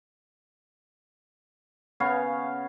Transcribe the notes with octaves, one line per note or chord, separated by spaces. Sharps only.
C#3 B3 C#5 F5